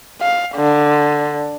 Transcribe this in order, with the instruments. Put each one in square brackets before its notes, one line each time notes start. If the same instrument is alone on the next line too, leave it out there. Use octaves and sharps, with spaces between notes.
[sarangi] F5
D3